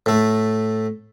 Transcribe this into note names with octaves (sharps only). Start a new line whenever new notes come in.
A2 A3